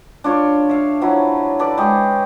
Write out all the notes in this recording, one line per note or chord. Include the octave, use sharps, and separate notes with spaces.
D4 F4 C#5
E5 F5
F3 F#3 E4
A4 B4 D5
G#3 G4 C#5 D#5